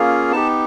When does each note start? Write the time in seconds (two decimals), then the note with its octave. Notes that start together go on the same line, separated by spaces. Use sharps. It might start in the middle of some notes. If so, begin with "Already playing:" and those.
Already playing: A#3 C#4 F4 G#4
0.32 B3 D#4 G4 A5